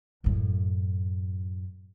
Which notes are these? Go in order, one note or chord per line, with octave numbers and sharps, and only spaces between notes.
F#2 A2